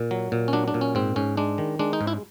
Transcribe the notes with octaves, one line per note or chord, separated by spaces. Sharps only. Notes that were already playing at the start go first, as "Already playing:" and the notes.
Already playing: A#2
F#3
A#2
C#4
F#3 D4
D4
A#2
C#4
G#2 C4
G#2 C#4
G#3 D4
D#3
G#3 D4
D#4
G#2
E4